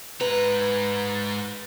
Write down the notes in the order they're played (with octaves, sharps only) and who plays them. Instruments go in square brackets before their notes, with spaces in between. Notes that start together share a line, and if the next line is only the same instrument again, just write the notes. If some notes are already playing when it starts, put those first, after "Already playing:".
[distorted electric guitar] G#2 A#5 [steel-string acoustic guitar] B4